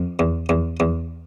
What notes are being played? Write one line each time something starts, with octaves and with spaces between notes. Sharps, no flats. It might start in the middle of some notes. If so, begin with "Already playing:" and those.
Already playing: F2
E2
E2
E2